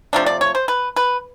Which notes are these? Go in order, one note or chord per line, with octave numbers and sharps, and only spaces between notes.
C3 F3 A3 D4
D5
C#5
C5
B4
B4